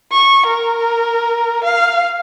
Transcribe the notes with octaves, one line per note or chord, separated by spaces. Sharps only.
C#6
A#4
F5